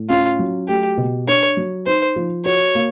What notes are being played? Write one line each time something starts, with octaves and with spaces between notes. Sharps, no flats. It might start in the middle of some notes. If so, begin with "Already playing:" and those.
Already playing: A2
C#4 F4
F#3
A3 G4
B2
D4 C#5
F#3
D#4 C5
F3
F#4 C#5
A#3